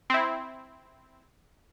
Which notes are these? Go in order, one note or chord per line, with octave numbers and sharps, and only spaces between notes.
C4 E4